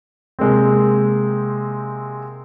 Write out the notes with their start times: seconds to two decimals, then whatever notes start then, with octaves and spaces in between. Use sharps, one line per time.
0.39 C3 G#3 A#3 C4